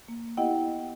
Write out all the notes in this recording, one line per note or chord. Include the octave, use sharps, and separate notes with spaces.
A#3
B3 E4 G4 D#5 F#5 G5